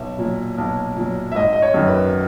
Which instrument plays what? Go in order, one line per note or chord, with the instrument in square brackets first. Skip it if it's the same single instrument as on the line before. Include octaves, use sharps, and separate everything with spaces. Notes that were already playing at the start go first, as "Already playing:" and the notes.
Already playing: [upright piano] B1 E5
A#2 F#3
B1
A#2 F#3
E5
G#1 D#5
D#5
C#5
F#2 D#3
B4